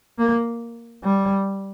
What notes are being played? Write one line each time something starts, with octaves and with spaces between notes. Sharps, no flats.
A#3
G3